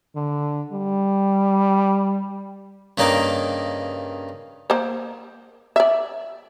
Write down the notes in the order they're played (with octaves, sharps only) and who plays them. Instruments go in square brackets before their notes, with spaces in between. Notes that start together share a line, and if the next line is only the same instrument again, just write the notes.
[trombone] D3
G3
[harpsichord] G2 C#3 A#3 D#4 D6
[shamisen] A#3 C5
D5 E5